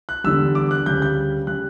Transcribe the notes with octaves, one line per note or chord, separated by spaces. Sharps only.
F#6
E2 D3 G3 E6
D6
F#6
D2 C#3 G3 G6
G6
C#3 G3 F#6